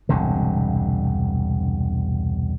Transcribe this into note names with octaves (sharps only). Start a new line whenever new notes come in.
E1 C2 G2 D3